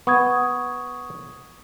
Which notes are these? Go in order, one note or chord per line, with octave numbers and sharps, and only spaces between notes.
B3 C#6 D#6 G#6